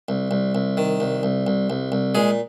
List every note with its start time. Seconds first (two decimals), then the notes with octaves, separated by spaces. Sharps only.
0.09 C2
0.31 C2
0.55 C2
0.77 D#3
1.00 C2
1.23 C2
1.47 C2
1.70 C2
1.92 C2
2.15 A#2 G#3 G#4